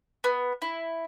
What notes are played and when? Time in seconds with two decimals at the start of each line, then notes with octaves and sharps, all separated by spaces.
0.24 B3
0.62 E4